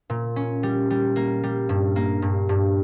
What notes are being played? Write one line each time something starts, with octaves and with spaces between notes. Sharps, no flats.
A#2
C#4
G3
G3
A#3
G3
G2
A#3
G2
G2